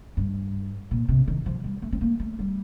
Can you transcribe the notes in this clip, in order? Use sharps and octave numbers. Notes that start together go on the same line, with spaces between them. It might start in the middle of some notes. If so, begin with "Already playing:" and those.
G2
A#2
C3
D#3
F3
G3
A3
C4
A#3
A3
G3